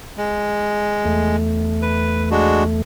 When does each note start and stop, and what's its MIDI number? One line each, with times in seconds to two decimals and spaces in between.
0.18 1.36 56
1.05 2.82 40
1.05 2.82 57
1.82 2.29 71
2.31 2.64 56
2.31 2.64 62
2.31 2.64 66